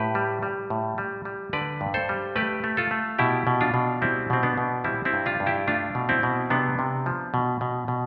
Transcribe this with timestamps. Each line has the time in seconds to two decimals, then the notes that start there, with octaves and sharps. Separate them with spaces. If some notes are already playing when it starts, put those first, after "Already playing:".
Already playing: A2 G4 B4
0.15 G3
0.43 G3
0.70 A2
0.98 G3
1.25 G3
1.53 D3 B4 D5
1.81 G2
1.94 A4 C5
2.09 G3
2.36 A3 G4 B4
2.64 A3
2.77 F4 A4
2.91 A3
3.19 B2 E4 G4
3.47 B2
3.61 D4 F4
3.74 B2
4.02 G3 C4 E4
4.30 B2 C4
4.43 B3 D4
4.57 B2
4.84 G3 C4 E4
5.05 C4 E4
5.13 G2
5.26 D4 F4
5.40 G2
5.46 E4 G4
5.67 A3 D4 F4
5.95 B2
6.09 C4 E4
6.23 B2
6.50 C3 B3 D4
6.79 C3
7.06 F3
7.34 B2
7.61 B2
7.88 B2